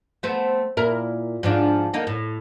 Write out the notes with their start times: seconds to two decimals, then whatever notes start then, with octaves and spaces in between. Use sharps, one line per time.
0.23 A3 B3 C4
0.77 A#2 E4 A#4
1.43 G#2 F3 D4
1.93 D3 A#3 D#4
2.07 A2